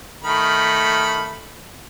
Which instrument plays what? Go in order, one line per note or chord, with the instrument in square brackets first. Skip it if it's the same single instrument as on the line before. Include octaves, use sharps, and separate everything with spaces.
[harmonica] D#3 A3 B5